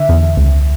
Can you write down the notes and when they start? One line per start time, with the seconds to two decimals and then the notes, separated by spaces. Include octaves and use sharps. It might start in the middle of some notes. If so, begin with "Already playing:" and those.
Already playing: D3 E5
0.09 E2
0.37 C#2